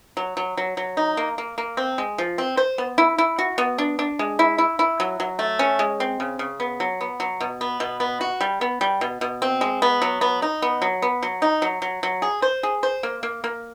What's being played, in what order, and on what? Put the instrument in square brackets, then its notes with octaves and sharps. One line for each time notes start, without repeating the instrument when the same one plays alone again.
[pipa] F#3
F#3
F#3
F#3
D#4
A#3
A#3
A#3
C4
G#3
F3
C4
C5
B3
E4
E4
F#4
B3
D4
D4
G#3
E4
E4
E4
F#3
F#3
A3
C#4
G#3
C4
C#3
C#3
B3
F#3
B3
F#3
B2
B3
B2
B3
F#4
G3
B3
G3
B2
B2
C4
G#3
B3
F#3
B3
D#4
B3
F#3
B3
F#3
D#4
F#3
F#3
F#3
G#4
C5
G#4
C5
A#3
A#3
A#3